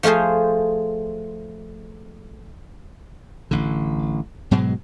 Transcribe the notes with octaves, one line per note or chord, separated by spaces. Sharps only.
F3 A3 F4 G#4 C5
A1 D3
G#2 B2 F#3 G#3